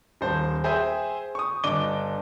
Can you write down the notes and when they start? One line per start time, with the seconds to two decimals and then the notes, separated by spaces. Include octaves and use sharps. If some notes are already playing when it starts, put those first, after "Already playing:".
0.21 D#1 C5 A5
0.64 G#4 C5 E5 G5 G#5
1.35 C#6 D#6
1.64 G1 D4 D#5 D6 D#7 G7